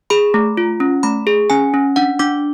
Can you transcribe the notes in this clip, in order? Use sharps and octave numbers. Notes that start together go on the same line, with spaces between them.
G#4 B5
A3
F4
C#4
A3 B5
G#4
C#4 G#5
C#4
D4 F#5
D4 D6